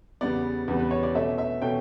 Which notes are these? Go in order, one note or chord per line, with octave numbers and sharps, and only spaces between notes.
E2 C#3 G3 B3 D5
E2 C#3 G3 B3
B4
C#5
D5
B2 A3 C#4 E5
E5
B2 A3 C#4 G5